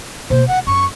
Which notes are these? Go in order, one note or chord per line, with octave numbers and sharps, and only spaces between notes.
B2 A#3 C5
G#3 F#5
F#2 C#6